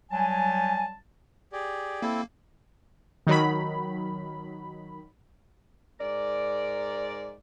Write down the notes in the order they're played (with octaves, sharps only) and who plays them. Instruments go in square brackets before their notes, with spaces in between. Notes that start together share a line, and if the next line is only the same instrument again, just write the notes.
[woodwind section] F#3 G3 A5 [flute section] G#5
[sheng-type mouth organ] G4 G#4 D5
[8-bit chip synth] A#3 [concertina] C4 E4 A4
[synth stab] D#3 F#3 B5
[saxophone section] G#2 A#4 D5